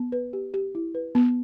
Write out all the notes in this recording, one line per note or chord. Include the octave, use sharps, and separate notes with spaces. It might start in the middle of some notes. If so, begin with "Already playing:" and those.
Already playing: B3
B4
G4
G4
E4
B4
B3